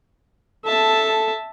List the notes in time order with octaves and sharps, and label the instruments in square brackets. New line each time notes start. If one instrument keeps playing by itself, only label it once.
[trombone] A4 [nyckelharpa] E5 A5